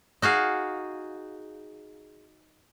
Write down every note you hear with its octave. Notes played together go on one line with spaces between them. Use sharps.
D#4 F#4 G#4 F5